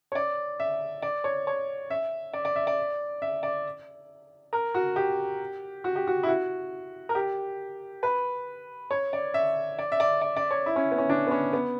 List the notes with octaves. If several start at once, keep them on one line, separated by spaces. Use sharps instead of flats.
C#5
D5
E5
D5
C#5
C#5
E5
D5
D5
E5
D5
E5
D5
A#4
F#4
G4
F#4
G4
F#4
E4
F#4
A#4
G4
B4
C#5
D5
E5
D5
E5
D5
D5
D5
C#5
E4
C#4
B3
C#4
D4
B3
C#4
B3